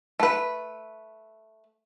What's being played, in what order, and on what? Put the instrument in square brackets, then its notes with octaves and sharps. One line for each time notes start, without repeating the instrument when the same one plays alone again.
[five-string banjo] A3 B4